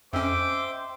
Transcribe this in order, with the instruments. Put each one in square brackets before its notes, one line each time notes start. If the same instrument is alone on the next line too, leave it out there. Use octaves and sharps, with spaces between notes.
[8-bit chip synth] F2 C#4 [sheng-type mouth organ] C5 G5 C6 [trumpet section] D#5 D6 [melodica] E5